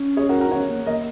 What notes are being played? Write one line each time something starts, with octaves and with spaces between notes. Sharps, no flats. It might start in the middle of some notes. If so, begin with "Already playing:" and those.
Already playing: C#4
G#4 C#5
F#4 A#4
F#4 A#4
D#4
C#4 C#5 F#5
A#3
A#3 A#4 D#5